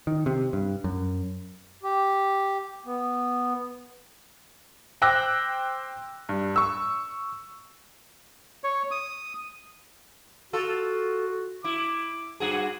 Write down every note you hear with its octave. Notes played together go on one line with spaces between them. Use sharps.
D#3
C3
G2
F#2
G4
B3
C5 G5 D6 E6 F#6 A#6
G2
C#6 E6
C#5
D#6
F4 F#4 A4
E4 D6
G2 F#4 G#4